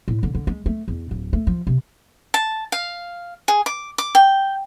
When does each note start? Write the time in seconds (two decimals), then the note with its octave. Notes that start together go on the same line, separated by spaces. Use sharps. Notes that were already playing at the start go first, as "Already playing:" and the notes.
0.08 A2
0.23 D3
0.35 D3
0.47 G#3
0.66 A3
0.88 E2
1.11 D1
1.33 A3
1.47 F3
1.67 C3
2.34 A5
2.72 F5
3.48 G#4
3.66 D6
3.98 D6
4.15 G5